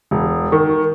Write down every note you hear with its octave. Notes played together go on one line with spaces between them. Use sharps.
E1
D#3